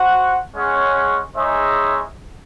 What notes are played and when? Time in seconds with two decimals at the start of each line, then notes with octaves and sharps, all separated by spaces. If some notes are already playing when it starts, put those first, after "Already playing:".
Already playing: F#4 C5 F#5
0.53 G#3 C#4 G#4 C#5 F#5
1.35 G#3 D#4 G#4 C#5 E5